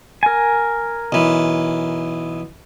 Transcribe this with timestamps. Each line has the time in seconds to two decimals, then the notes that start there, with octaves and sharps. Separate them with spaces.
0.23 A#4 G#5
1.12 B1 E3